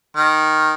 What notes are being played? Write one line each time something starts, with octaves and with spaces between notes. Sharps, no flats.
D#3